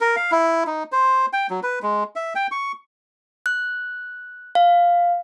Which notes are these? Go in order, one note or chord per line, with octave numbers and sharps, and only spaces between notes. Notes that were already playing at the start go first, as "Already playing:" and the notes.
A#4
F5
E4
D#4
C5
G5
F#3
B4
G#3
E5
G5
C#6
F#6
F5